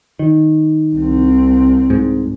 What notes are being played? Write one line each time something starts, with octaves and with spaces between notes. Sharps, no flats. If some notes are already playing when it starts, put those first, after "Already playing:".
D#3
C2 C4
G#2